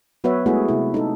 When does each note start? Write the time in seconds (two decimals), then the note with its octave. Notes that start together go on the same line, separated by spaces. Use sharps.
0.24 F#3 B3 F#4 B4 C#5 E5
0.46 G#3 A3 B3 E4 F#4 G#4
0.68 C3 E4
0.94 D#4 A4